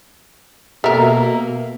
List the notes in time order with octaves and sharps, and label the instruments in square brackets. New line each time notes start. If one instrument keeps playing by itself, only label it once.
[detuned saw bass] B2 [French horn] A#3 [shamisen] A4 A#4 [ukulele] E5 A#5